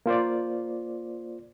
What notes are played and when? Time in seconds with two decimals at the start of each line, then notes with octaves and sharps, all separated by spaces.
0.06 A#3 F4 C5 D5